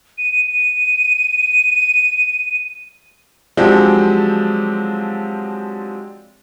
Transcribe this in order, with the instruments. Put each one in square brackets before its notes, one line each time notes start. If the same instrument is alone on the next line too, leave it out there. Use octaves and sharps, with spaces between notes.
[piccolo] D#7
D#7
[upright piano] F3 F#3 G#3 C4 D4 G4